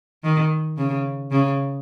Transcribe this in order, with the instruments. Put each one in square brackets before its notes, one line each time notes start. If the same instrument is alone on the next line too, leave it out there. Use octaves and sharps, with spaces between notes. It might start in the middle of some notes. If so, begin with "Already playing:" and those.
[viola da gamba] D#3
C#3
C#3